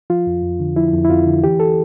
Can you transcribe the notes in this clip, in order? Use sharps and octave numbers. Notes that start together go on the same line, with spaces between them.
F3 F4
F2
F2
D3
F3 E4
F2
E4
F2 F4
D3
E3 G4
A4